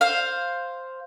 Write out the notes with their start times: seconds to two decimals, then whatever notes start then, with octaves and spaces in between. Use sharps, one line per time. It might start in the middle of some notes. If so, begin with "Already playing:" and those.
0.01 C5 F5